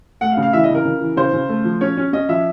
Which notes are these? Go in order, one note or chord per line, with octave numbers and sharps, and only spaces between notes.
A3 F#5
F5
C#3
F5
E3 E5
D#5
C#3 A#4
C#3
E3
C#3 C5
C#3
A3
F3
C#4 C#5
C#4
C#4 D#5
F3 E5